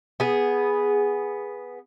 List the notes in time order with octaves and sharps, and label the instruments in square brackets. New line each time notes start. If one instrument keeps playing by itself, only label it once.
[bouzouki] B3 G#4